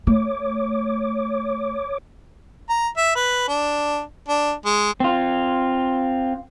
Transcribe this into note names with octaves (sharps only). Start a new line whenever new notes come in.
A3 C#5 D6
A#5
E5
B4
D4
D4
G#3
C4 F4